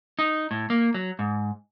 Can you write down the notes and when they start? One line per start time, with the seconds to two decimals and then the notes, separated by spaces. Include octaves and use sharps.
0.19 D#4
0.51 A2
0.70 A#3
0.94 F#3
1.19 G#2